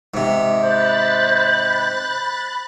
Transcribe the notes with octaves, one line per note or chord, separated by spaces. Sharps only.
G#2 C3
C5 B5 F#6 A6